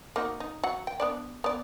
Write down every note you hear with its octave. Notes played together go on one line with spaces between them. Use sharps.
A#3 D#4 F#4
D#4
F#3 F#5
G5
B3 D4 D5
B3 D5